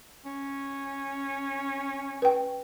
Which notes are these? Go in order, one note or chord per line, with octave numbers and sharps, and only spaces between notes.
C#4
B4 G5